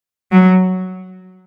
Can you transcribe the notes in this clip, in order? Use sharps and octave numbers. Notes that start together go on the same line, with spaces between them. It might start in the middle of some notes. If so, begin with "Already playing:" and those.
F#3